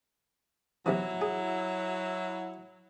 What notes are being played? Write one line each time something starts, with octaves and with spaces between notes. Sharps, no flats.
B1 C3 E3 F#3 E4
G#4